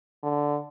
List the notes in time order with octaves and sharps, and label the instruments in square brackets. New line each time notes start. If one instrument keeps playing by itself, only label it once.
[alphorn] D3